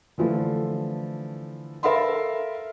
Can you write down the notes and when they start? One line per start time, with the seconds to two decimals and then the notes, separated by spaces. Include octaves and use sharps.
0.18 D3 E3 F3 A3
1.83 A4 A#4 E5 F5 B5 C6